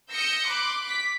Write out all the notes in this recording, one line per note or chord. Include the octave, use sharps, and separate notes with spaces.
D#6 E6 G6 A#6 C#7
B5 C6 D6 F#6
D6 B6